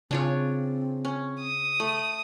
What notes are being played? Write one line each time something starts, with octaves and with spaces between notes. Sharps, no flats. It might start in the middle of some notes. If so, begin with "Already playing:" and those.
C#3 C4 D4 F4 C#5
C#4
D#6
A3